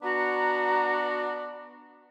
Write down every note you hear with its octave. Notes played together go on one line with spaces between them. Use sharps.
B3 D4 F#4 A#5